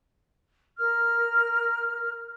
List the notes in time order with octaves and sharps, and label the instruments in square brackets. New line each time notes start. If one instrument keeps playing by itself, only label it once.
[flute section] A#4 F6